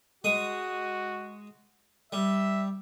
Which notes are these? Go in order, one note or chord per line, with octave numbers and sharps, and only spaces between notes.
G#3 F#4 D#6
G3 E5